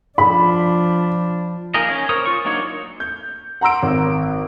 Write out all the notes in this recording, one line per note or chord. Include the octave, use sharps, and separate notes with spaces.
F3 D4 B5
A#3 D#4 G#4 A#4 D#5
C#4
A#4 C5 C#5 D#6
F4 C#6
F#3 A#3 D4 D#4 C#5
G6
F#5 A#5 C6 E6 D7
G#1